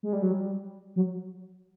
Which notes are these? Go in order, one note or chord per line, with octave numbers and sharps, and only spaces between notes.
G#3
G3
F#3
G3
F#3